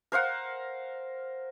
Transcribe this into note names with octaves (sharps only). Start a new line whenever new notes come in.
A#4 C5 F5 F#5